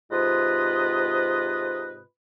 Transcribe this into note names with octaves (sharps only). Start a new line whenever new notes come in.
G#2 C3 F4 B4 D#5